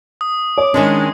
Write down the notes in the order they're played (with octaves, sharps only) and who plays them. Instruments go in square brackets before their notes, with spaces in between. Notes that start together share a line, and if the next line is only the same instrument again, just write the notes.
[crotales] D#6
[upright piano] C#5 [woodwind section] D6
[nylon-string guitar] D#3 C#4 D4 [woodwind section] G#3